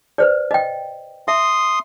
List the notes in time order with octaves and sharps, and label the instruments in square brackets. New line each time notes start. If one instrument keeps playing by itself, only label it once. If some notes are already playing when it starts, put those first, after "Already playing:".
[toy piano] B4 C5 D5
D#5 G5
[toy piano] E5 [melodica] C6 D#6